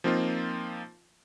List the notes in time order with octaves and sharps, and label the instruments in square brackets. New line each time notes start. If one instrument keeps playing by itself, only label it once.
[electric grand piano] F3 A#3 C4 D#4 F4